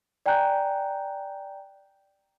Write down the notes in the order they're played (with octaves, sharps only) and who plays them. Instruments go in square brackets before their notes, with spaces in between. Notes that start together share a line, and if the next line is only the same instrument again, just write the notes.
[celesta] D5 G5 G#5 A#5 F#6 G6